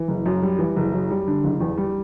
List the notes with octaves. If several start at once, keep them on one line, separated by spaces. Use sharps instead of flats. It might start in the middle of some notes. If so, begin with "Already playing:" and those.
Already playing: E3
F#1
F#2
G3
E3
F#1
F#2
G3
D3
F#1
E2
G3